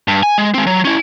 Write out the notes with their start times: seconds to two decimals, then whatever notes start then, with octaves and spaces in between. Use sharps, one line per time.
0.08 G2
0.23 G#5
0.38 G#3
0.54 G#3 C4
0.67 F#3
0.85 C#4 E4